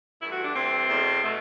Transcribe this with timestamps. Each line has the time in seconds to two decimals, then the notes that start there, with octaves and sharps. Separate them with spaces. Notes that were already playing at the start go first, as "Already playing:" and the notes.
0.21 G2 E3 A3 E4
0.32 F#4
0.43 D4
0.55 G2 E3 A3 C4
0.88 E2 B2 A3
1.22 B2 A3